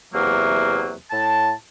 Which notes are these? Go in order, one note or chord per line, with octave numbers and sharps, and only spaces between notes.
E2 C3 F#3 A#3
A2 A5